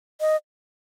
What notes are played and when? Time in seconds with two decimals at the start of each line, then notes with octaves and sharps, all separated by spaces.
0.21 D#5